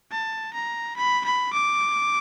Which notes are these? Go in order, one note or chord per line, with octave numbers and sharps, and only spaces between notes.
A5
A#5
B5
B5
D6